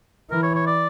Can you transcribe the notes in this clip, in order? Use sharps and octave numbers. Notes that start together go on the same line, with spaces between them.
E3 A#4
C#5
C#5
D5